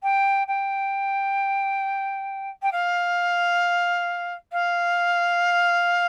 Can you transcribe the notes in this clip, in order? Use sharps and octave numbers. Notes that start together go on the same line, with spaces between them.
G5
G5
G5
F5
F5